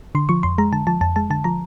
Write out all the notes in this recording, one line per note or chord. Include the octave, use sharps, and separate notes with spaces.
D3 C6
F3 C#6
F2 C6
G#3 A#5
D3 A5
F3 A5
F2 A5
G#3 A5
D3 A5
F3 A#5